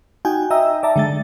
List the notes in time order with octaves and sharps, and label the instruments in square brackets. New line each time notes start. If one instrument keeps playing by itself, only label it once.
[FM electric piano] D#4 F#4 G5 G#5
D#5 E5 G5 A#5 E6
D5 E5 A5 A#5
D3 G#3 A6